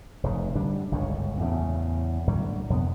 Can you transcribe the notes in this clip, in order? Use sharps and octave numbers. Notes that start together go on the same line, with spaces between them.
F1 G#2 C#3
D3 G3 D4
G1 C#2 F#2 A2
E2 A2 C#3
A2 D3 F#3 G3
F2 C3 B3